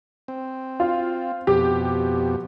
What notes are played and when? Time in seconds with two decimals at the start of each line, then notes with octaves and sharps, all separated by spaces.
0.28 C4
0.80 F4
1.47 F2 B2 G4